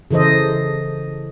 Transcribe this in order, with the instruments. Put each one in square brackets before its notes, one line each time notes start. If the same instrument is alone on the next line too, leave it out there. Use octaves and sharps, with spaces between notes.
[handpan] C#3 E3 A4 C5 D#5